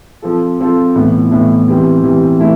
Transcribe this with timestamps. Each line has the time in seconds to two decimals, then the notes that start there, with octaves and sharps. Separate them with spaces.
0.22 F3 C4 F4 A4
0.60 F3 C4 F4 A4
0.95 A2 E3 B3
1.31 A2 E3 B3
1.68 E3 G3 C4 G4
2.03 E3 G3 C4 G4
2.39 E3 A3 E4